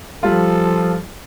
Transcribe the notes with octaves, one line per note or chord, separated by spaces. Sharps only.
F3 G3 F4 A4